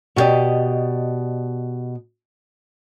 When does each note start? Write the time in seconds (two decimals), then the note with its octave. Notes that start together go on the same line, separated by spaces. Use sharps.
0.16 B2 F#4 G4 D5 D#5